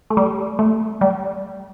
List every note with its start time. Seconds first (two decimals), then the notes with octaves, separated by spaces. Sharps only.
0.10 A3
0.17 G3
0.59 A3
1.01 G3